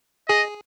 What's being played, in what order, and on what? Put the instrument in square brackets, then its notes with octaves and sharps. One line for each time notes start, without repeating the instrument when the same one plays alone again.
[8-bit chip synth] G#4 [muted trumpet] D#5